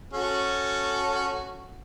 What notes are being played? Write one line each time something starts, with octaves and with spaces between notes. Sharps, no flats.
C#4 F#4 A4